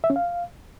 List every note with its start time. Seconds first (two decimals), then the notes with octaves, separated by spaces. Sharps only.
0.04 E5
0.10 C#4
0.16 F5